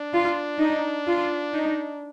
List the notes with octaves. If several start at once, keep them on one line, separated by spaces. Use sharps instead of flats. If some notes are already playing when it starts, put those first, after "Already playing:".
Already playing: D4
F4
D#4
F4
D#4